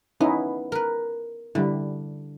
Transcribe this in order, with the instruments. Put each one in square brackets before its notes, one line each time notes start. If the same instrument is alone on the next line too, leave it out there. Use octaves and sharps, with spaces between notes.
[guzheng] B3 [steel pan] C#4 D#4 E4
[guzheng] A#4 B4
[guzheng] D3 [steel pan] G3 E4